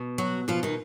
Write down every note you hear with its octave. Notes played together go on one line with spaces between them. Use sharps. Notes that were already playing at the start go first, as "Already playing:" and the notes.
Already playing: B2
F#3 F#4
B2 F3 F4
D#3 D#4